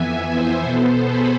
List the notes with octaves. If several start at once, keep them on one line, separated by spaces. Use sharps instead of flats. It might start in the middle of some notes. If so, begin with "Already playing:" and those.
Already playing: F2 E3 B3 E5 G#5
C5 E5
B2 B3 A4 C5
G#4 B4